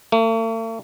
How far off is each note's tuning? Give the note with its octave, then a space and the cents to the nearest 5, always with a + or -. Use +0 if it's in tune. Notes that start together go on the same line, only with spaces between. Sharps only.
A3 +45